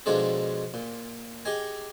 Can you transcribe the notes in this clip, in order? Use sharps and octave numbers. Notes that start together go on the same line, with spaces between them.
B2 F3 G#3 D4 G#4 A4
A#2
G4 G#4 D#5 G#5